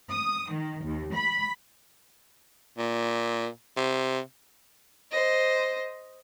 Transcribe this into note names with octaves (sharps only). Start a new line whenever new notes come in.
D#6
D#3
D#2
B5
A#2
C3
C5 D#5